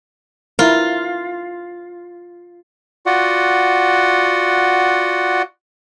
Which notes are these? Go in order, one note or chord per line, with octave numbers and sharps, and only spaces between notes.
E4 F4 A#4
F4 F#4 D5 F#5